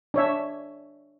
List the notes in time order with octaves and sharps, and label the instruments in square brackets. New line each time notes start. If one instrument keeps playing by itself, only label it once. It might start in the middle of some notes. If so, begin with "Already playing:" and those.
[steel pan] D4 C#5 E5